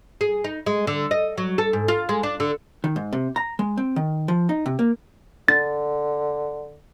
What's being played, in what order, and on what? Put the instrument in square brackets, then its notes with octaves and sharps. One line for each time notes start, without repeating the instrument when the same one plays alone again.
[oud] G#4
D#4
G#3
D3
D#5
F#3
A4
G#2
F4
G#3
D4
D3
[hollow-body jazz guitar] D#3
G#2
C3
A#5
G#3
C4
D#3
F3
D#4
C3
A#3
[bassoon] D3 [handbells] A6